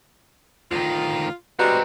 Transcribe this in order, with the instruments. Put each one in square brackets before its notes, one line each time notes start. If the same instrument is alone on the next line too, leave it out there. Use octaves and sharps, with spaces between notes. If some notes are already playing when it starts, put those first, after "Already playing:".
[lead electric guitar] D2 D#3 [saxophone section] F4
[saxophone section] G3 [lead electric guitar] G#3 C4 [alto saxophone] F#4 [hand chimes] B4 D#5 A#5